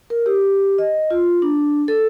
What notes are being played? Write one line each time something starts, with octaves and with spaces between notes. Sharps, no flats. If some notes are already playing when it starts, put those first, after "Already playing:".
A#4
G4
D#5
F4
D4
A4